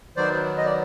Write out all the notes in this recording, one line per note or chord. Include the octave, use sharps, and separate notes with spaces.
D#3 F#3 B3 C5 D5
D#5
D5